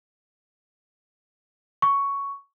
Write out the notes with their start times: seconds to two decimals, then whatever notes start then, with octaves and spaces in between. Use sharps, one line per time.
1.82 C#6